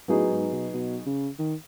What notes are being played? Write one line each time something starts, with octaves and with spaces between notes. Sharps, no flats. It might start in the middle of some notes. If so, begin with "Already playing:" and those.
A2 F#3 B3 D#4 G#4
G#2
B2
B2
C#3
D#3